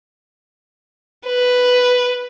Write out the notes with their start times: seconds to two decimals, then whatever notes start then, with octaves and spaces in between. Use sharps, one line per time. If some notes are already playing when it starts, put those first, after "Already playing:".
1.25 B4